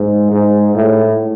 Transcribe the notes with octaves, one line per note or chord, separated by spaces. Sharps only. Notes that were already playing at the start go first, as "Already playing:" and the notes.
Already playing: G#2
G#2
A2